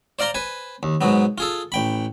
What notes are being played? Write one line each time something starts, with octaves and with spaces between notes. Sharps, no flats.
C5 D5 F5 A#5 C6
B4 C5 G#5
D#2
G#2 B2 F#3 B3
F4 G#4 A4
A1 G5 B5